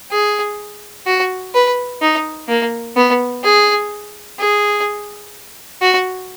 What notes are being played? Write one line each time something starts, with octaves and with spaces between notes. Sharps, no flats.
G#4
F#4
B4
D#4
A#3
B3
G#4
G#4
F#4